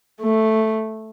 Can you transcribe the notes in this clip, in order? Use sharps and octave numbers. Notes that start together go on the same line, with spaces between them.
A3